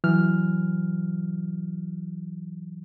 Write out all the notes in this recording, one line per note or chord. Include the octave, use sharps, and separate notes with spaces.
E3 F#3 F6